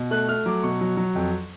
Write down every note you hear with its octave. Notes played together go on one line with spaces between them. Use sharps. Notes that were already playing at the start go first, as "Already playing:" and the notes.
Already playing: B2
A3 F#6
A3 F6
F#3 D6
B2 C#6
F#3
F#3
F2